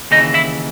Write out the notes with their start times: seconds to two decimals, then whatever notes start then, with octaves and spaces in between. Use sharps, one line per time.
0.11 D#2 C#3 E3 D#4 D#5
0.34 E4 E5